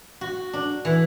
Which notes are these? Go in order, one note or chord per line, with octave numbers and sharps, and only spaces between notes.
F#4
D4
E3